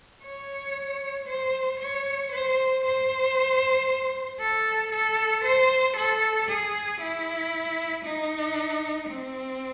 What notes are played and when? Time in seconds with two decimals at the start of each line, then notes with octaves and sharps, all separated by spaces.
0.23 C#5
1.27 C5
1.79 C#5
2.32 C5
2.84 C5
4.40 A4
4.92 A4
5.44 C5
5.96 A4
6.49 G#4
7.00 E4
8.05 D#4
9.09 C4